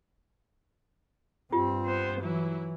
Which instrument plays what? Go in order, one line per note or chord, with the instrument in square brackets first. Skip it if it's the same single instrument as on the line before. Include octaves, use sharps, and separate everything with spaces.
[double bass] G2 C4 [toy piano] F4 G4
[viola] B3 C5
[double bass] E3 [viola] F#3 E4